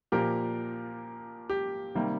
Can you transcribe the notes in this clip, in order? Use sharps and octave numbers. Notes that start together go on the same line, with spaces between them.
A#2 F3 A#3 G4 A#4
G4
C3 D#3 G3 A#3